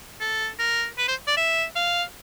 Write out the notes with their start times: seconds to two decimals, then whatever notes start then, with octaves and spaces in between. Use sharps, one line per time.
0.21 A4
0.59 A#4
0.98 B4
1.08 C5
1.27 D5
1.37 E5
1.76 F5